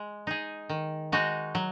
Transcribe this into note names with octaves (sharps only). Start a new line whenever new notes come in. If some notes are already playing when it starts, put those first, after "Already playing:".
Already playing: G#3
D#4 G#4
D#3
G#3 D#4 F#4
F#3